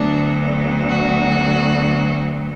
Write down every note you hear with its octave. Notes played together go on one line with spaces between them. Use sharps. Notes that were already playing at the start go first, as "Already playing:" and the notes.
Already playing: D2 D3 F#3 B3 D4
F#4